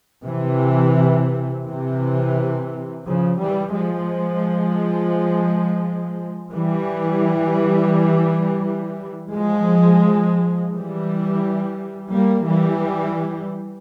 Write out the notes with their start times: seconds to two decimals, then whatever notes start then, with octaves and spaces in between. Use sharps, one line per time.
0.25 C3 E3
1.65 C3 E3
3.04 C#3 F3
3.39 E3 G3
3.74 F3 G#3
6.54 E3 G3
9.33 F3 G#3
10.73 E3 G3
12.13 G3 A#3
12.48 E3 G3